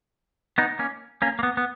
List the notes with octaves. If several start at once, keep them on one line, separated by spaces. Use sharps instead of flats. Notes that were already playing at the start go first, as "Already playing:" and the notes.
B3 D#4
A#3 C#4
A#3 C#4
A#3
B3
B3